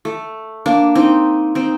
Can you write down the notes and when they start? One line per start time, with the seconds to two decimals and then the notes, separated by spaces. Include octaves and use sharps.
0.05 A3
0.66 A#3 D4
0.95 C4 D#4
1.55 C4 D#4